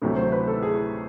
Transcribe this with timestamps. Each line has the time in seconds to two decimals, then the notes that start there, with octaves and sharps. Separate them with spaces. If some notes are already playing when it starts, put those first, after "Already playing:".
0.02 D2 C3 D#3 F#3 A3
0.16 C5
0.32 B4
0.48 A4
0.62 G#4